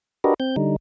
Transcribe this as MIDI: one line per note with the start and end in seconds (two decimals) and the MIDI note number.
0.24 0.34 62
0.24 0.34 66
0.24 0.34 67
0.24 0.34 70
0.24 0.34 71
0.24 0.34 75
0.40 0.56 60
0.40 0.56 91
0.56 0.76 50
0.56 0.76 55
0.56 0.76 63